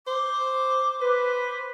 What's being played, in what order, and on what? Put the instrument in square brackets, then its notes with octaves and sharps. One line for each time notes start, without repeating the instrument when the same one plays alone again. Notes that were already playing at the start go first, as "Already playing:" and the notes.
[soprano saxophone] C5 [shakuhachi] D6
[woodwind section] B4 [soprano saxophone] C5